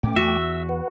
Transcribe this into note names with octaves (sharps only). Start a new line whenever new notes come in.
A2 A3 C#4 G5 D6
E2 F#4 E5
E6
B4 F#5